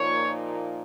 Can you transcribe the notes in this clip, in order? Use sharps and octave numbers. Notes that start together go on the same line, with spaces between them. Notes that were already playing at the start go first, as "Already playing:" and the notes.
Already playing: A#2 F3 A#3 D#4 C#5